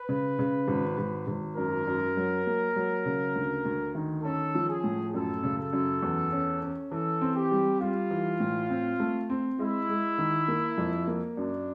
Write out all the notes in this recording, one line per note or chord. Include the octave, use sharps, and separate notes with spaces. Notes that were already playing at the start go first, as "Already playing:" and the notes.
Already playing: B4
C#3
C#3
G#1
G#1
G#1
F#2 A#4
F#2
F#3
A#3
F#3
C#3
D2
D2
D#3
C#4 A4
F3
G#4
A2
F#2 A4
C#3
A4
F#2
E2
C#4
C#4
E3 A4
C4
G4
G3
G3 F4
E3
A2
C4
A3
C4
G#3 E4
G#3
D#3
A#3
F2
A#3
F#2 D4